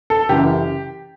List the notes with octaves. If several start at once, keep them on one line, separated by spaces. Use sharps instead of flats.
A4
F#1 F#2 E3 G4